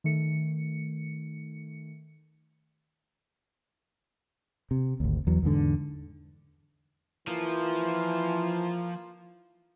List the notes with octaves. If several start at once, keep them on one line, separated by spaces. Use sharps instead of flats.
D#3 A3 C#7
C3
G#1 D2
E2 F#3
E2 G#2 D3
E3 F3 A#3 F4